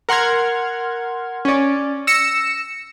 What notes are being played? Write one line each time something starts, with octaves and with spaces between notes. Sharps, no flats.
A#4 F#5 C6 F6 G#6
C#4 D5
E6 A#6 C#7 E7